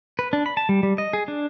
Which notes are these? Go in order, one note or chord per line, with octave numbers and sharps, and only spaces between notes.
B4
D4
B5
A5
G3
G3
D#5
G#4
D4